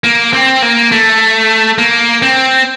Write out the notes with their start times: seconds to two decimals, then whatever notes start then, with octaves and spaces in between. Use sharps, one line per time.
0.04 A#3
0.33 C4
0.62 A#3
0.92 A3
1.78 A#3
2.22 C4